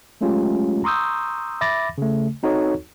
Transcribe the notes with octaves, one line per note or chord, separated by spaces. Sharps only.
F#3 G#3 A3 C#4 F4 G4
A#5 C6 C#6 D#6 E6 G6
E5 B5 D6 A6 A#6
C#3 A3
C4 D#4 F#4 A4 C#5